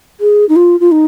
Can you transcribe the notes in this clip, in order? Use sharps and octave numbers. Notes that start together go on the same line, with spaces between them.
G#4
D#4
F4
F4
D#4